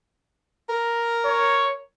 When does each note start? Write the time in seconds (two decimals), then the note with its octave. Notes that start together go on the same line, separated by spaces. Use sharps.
0.69 A#4
1.25 C#5